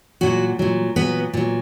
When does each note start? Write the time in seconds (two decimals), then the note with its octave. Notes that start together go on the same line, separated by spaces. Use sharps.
0.21 A#2 F#3 F#4
0.59 A#2 F#3
0.96 A#2 F#3 B3
1.34 A#2 F#3